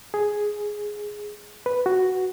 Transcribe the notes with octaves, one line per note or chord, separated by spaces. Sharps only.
G#4
B4
F#4